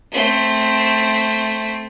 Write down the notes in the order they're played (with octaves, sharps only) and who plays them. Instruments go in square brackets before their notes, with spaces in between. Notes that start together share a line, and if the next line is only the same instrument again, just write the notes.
[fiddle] A3 C4